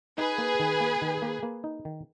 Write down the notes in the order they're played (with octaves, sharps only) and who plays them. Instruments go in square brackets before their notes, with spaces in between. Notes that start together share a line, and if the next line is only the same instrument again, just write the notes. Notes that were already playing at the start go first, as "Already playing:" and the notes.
[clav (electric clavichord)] D#4 [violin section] G#4 B4
[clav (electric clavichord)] A#3
D#3
A#3
D#3
A#3
A#3
D#4
D#3